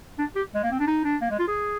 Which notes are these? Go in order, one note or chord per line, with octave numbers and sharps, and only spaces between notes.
D4
G4
G#3
A#3
C4
D4
D#4
D4
A#3
G#3
F4
G#4